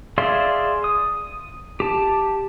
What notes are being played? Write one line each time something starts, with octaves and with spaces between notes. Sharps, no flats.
G#4 D5 E5 F5 C6
D#6
G4 A5